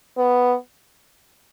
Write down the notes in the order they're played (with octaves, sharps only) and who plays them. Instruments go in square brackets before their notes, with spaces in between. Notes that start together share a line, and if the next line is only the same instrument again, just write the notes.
[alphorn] B3